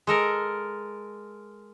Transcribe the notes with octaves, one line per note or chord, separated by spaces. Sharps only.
G#3 A4 A#4